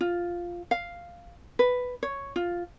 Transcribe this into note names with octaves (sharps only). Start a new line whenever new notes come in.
F4
F5
B4
C#5
F4